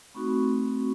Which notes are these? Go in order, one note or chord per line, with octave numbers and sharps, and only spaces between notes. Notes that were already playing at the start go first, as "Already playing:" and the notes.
A3 C4 D#4 F#4 B5 C#6